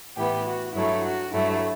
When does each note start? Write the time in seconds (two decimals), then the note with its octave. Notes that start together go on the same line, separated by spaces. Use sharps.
0.16 A2 E3 B3 G4
0.46 F#4
0.74 G2 F#3 A3 E4
1.04 F#4
1.33 G2 F#3 A3 E4